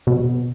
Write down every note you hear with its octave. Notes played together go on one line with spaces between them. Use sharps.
B2